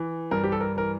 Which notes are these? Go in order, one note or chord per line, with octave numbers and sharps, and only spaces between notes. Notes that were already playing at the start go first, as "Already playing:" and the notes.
Already playing: E3
G2 A#4
G4
A4
A#4
E3 A#4